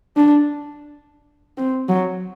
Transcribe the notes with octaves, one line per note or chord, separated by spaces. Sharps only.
D4
C4
F#3